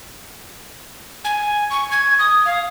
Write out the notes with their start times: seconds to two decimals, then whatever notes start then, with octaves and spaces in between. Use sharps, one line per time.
1.25 G#5
1.71 C#6
1.91 G#6
2.19 D#6
2.45 F5